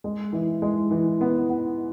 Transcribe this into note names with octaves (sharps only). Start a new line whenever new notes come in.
G#3
E3
G#3
E3
B3
B3